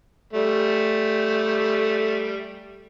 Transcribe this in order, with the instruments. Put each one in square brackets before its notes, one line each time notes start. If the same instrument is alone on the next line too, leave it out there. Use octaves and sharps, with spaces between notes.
[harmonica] G3 A3